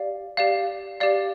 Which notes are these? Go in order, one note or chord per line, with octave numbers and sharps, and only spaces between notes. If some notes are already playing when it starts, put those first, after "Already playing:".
Already playing: G4 D5 F5
G4 D5 F5
G4 D5 F5